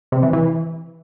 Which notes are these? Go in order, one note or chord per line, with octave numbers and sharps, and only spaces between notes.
C3
E3
E3